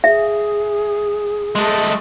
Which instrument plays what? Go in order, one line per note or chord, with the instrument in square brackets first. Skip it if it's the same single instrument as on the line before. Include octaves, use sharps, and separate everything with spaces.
[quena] G#4 [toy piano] E5
[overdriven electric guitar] G#3 A3